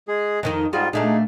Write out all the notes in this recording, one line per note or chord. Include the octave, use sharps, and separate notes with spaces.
G#3 G#4
F2 D#3 D#4 D#5
G#2 G3 F4 F#4 G#4
A#2 A3 D4 D#4 G#4